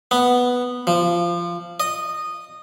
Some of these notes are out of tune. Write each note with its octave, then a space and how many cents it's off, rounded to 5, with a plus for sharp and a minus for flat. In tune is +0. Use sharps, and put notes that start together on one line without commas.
B3 +0
F3 -15
D#5 -15